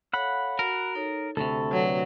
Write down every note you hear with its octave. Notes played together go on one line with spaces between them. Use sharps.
A4 C#5 F5 F#5 B5
F#4 A#4
D#4 A4 C#5
D2 C3 A4 B5 C#6
F#3 B4 C#5 D5